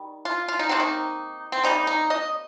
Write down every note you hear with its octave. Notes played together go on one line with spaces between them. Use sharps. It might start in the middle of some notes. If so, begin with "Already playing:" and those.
Already playing: D#3 G3
F4
F4
D#4
C3 D#3 A#3 C4
D#4
C4
C3 G3 A#3 D#4
D#4
D#5